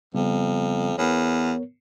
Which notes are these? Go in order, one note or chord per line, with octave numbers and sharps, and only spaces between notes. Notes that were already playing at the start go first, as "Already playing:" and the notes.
F2 C#3 G3 B3
E2 B3 A#4 C#5